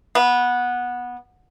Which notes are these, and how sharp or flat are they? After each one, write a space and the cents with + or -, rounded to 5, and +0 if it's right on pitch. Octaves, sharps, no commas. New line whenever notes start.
B3 -15